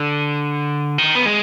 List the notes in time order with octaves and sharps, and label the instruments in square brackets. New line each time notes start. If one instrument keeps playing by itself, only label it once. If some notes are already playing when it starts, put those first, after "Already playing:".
Already playing: [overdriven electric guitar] D3
D#3
B3
G#3